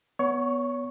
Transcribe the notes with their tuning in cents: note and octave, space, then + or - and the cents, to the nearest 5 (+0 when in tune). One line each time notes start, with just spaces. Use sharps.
B3 +0 C#5 +25 C#6 -5